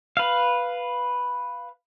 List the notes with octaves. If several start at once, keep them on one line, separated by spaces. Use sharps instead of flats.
B4 F5